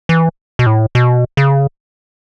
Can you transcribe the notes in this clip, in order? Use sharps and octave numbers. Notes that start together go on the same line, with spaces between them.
E3
B2
A2
B2
C#3